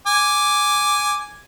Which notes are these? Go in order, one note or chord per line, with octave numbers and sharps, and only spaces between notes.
G#5 D6